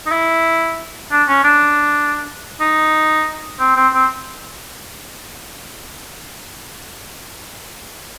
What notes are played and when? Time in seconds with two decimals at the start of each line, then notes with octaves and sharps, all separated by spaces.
0.07 D#4
0.12 E4
1.12 D4
1.29 C#4
1.44 D4
2.61 D#4
3.60 C4
3.76 C4
3.94 C4